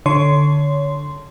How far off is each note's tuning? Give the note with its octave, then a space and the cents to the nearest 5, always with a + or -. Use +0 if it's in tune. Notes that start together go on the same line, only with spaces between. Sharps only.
D3 +0 C#5 +20 C6 -10